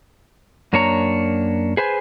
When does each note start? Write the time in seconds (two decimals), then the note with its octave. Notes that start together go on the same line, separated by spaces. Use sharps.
0.73 F#2 A#3 D4 C#5 A#5
1.77 G#4 B4 C5 G#5